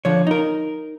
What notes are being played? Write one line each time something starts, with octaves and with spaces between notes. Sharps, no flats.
D3 F3 C#5
D#4 A#4